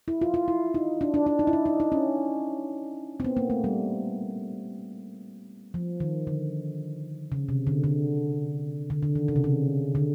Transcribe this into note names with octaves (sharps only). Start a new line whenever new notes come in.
E4
F4
F4
E4
D#4
D4
D4
D4
D#4
E4
D#4
D#4
D#4
C#4
C4
B3
A#3
A3
G3
F3
D#3
D3
C#3
C3
D3
D3
D3
D3
D#3
C#3
C3
C#3
D3